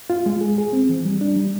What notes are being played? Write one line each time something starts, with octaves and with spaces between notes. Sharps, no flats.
F4
G#3
G#4
G#4
C4
E3
G3
D4
G3